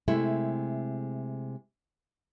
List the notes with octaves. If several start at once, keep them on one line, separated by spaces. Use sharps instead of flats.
C3 G#3 A3 E4